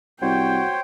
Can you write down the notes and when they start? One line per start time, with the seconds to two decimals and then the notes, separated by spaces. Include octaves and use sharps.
0.22 C2 F#4 C5 C#5 G5